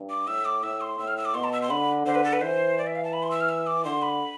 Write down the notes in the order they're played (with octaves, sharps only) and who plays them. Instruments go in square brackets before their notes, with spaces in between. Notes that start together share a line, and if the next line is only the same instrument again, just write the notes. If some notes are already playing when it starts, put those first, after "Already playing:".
Already playing: [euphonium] G2
[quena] D6
[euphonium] A2 [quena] E6
[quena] D6
[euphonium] A2 [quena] E6
[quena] C6
[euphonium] A2 [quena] E6
[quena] F6
E6
D6
[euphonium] B2 [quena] C6
[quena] A5
E6
C6
[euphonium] D3 [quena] B5
[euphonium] D3 [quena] C5
[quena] B4
A4
B4
[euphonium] E3 [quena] C5
[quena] D5
E5
F5
A5
B5
C6
E6
F6
E6
D6
[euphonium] D3 [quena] C6
[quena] B5